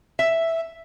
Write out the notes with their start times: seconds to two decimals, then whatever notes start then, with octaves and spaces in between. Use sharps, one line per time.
0.19 E5